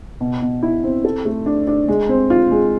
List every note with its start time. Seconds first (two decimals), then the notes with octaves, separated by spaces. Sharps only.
0.21 B2
0.42 B2
0.63 E4
0.84 C4
1.05 A4
1.25 A3
1.46 D4
1.67 D4
1.88 G#3
2.09 C4
2.30 F4
2.51 G#3